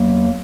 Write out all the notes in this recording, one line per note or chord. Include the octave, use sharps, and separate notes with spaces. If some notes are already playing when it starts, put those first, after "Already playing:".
Already playing: E2 F#3 A#3